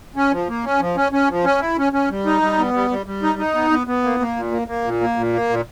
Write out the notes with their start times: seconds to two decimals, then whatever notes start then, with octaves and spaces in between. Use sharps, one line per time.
0.16 C#4
0.32 F3
0.49 A#3
0.64 C#4
0.80 F3
0.96 C#4
1.12 C#4
1.29 F3
1.44 C#4
1.61 E4
1.78 C#4
1.93 C#4
2.10 G3
2.26 D#4
2.42 G3
2.59 B3
2.74 G3
2.90 G3
3.06 G3
3.23 D#4
3.39 D#4
3.54 B3
3.70 B3
3.87 B3
4.04 A#3
4.20 A#3
4.36 A#2
4.51 A#3
4.68 A#3
4.84 A#2
5.01 A#3
5.16 A#2
5.33 A#3
5.49 A#2